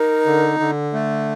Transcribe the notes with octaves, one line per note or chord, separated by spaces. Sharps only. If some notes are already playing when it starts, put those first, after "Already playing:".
Already playing: D#4 A#4
D3
D3
A3